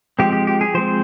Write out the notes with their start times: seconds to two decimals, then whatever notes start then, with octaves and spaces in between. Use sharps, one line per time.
0.19 F3 G#3 C4 G4
0.33 G4
0.47 G4
0.61 G#4
0.74 F3 G#3 C4 C5